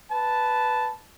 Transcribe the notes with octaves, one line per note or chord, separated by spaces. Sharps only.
B4 A5